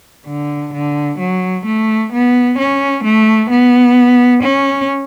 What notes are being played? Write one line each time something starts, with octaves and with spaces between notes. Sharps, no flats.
D3
D3
F#3
A3
B3
C#4
A3
B3
C#4